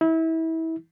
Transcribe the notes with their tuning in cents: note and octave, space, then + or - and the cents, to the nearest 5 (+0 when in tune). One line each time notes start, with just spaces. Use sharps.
E4 -30